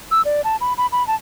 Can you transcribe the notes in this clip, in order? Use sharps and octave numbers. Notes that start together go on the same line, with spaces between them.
E6
D5
A5
B5
B5
B5
A5